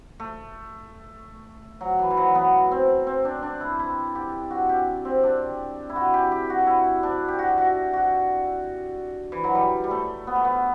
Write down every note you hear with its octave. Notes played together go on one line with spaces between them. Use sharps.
A3
F#3
E3
E3
F#3
B3
C4
C4
D4
D4
E4
E4
G4
F#4
G4
C4
D4
E4
F#4
G4
G4
F#4
E4
D4
G4
F#4
F#4
F#4
E3
F#3
G3
G3
A3
B3
A3
B3